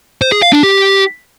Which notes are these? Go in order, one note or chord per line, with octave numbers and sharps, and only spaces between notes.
C5
G#4
F5
D4
G4